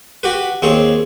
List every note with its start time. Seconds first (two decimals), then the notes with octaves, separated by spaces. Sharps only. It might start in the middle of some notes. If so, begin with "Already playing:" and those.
0.23 F#4 G4 B4
0.62 D#2 C4 G#4 C#5